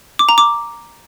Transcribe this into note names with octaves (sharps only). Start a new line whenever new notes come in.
D6
A#5
D6